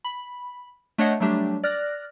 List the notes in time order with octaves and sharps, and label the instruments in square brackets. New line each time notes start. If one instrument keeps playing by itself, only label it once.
[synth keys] B5
A3 D4 C#5 D#5 F#5
F#3 G3 A3 D4 G4
D5 F6 F#6 A#6